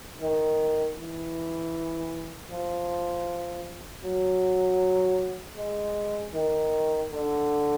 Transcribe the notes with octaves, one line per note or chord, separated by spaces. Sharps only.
D#3
E3
F3
F#3
G#3
D#3
D3